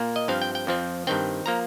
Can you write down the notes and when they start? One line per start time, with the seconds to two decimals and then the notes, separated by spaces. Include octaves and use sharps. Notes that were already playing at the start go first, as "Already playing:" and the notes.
Already playing: A#2 A#3
0.16 D#5
0.28 G2 F3 C4 F5
0.42 G5
0.55 G5
0.67 F2 F3 C4
1.07 G2 D#3 C4 G5
1.46 F3 A#3 A#5